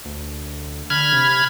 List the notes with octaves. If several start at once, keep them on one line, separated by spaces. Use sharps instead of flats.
D2
D3 B5 F6 G#6
C3